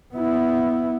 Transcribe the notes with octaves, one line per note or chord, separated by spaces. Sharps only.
B3 E4